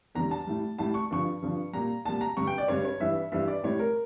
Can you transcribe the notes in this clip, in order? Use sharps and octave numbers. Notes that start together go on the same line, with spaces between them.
E2 D3 G3 A#5
A5
A2 G3
A2 G3 A5
C#6
G2 D3 F3 C#6
G2 D3 F3
A#2 G3 A#5
A#2 G3 A5
A#5
G2 D3 G3 C#6
G5
D5
G2 D3 G3 C#5
C#5
G2 E3 G3 E5
G2 E3 G3 E5
D5
A2 G3 C#5
A#4